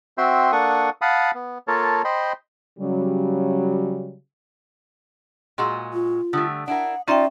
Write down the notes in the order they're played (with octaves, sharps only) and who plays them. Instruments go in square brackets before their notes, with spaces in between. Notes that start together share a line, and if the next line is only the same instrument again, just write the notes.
[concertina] C4 F#4 E5 G5 C6
A#3 D4 A4 F#5 C#6 D#6
F5 F#5 A5 B5 D#6
B3
A#3 F4 A4 A#4 C#5 A5
C5 D#5 G5 B5 C6
[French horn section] C#3 F#3 G3
[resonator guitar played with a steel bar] A#2 G#3 F#4 [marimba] C6 E6
[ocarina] F4
[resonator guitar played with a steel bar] D3 G3 A3 [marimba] D#6
[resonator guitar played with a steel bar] D4 E4 A#4 [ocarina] F#5
[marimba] C#4 E5 G5 [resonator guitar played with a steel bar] D#4 F4 [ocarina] D5